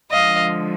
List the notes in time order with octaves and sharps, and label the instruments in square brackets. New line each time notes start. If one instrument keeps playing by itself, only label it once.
[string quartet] D3 F3 G#3 D#5 F5